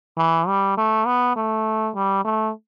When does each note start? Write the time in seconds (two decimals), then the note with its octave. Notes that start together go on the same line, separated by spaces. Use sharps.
0.18 E3
0.47 G3
0.78 A3
1.06 B3
1.36 A3
1.95 G3
2.25 A3